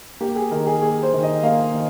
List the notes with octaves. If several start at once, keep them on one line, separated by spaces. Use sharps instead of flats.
A#3 G4
G#4
D#3 A#4
G#4
A#3 G#4
C5
D#3
D#5
A#3 F5
D#3